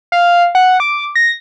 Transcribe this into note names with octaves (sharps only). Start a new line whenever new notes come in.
F5
F#5
D6
A#6